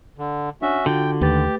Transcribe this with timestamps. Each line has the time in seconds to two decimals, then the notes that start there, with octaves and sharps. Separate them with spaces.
0.18 D3
0.62 C#4 D4 F#4 E5
0.86 D3 F4 F#4 G5
1.21 D#2 A3 G4 B4 A6